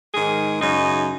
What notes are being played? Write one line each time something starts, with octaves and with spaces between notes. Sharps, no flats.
G#2 D#3 G#4
F#2 C#3 D#4